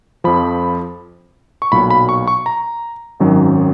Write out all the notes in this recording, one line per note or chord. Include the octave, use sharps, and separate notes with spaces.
F2 F3 B5
C#6
B1 A#2 F#3 B5
B5
C#6
C#6
A#5
G#1 F#2 D#3 F#3